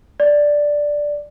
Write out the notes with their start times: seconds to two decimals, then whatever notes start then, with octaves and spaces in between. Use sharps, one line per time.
0.20 D5